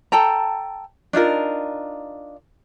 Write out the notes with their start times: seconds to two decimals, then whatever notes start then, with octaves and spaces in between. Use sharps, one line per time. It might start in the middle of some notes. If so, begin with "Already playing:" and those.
0.12 A4 G5 A5 A#5
1.13 D4 D#4 F4 A#4